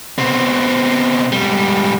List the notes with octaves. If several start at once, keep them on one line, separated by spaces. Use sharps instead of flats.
B2 C4
G#2 G3